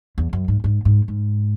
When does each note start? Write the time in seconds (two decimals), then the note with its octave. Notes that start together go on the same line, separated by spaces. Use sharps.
0.18 E2
0.33 F#2
0.48 G#2
0.64 G#2
0.85 G#2
1.08 G#2